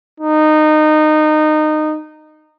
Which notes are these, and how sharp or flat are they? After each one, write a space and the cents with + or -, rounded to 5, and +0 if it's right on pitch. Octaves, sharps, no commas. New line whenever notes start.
D#4 -20